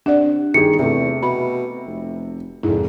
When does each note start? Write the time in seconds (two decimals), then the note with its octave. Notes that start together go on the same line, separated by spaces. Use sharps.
0.06 C3 D4 D5 F#5
0.54 G1 D#3 G4 G#4 C#7
0.79 E2 C3 A3
1.23 B2 B5
1.87 F1
2.63 F1 G#2 E4